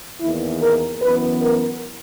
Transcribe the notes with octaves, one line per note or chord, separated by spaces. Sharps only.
E2 D#3 A#3 E4
A#4
F#2 E3 B3 B4
A#4